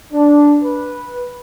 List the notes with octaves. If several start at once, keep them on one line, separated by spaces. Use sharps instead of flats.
D4
B4